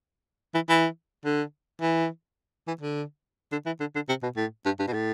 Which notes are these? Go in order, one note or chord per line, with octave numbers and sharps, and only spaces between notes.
E3
E3
D3
E3
E3
D3
D3
E3
D3
D3
C3
B2
A2
G2
G2
B2
A2